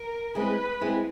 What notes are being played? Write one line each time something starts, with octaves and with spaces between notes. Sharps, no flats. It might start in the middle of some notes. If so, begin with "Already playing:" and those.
Already playing: A#4
G#3 C4 E4 G#4 B4
G#3 C4 E4 G#4